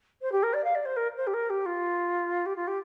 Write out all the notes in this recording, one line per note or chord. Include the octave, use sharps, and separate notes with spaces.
C5
G4
A#4
D5
F5
D5
C5
A#4
C5
G4
A#4
G4
F4
G4
F4
G4